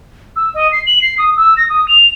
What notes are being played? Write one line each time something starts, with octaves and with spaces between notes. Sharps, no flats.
E6
D#5
C7
F#7
C7
D#6
E6
A#6
D#6
F7